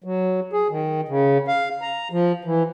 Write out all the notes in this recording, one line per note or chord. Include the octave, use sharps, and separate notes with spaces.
F#3
G#4
D#3
C#3
F5
A#5
F3
E3